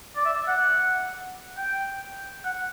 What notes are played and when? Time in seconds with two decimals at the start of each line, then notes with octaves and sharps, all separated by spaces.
0.16 D5
0.25 E5
0.48 F#5
1.57 G5
2.44 F#5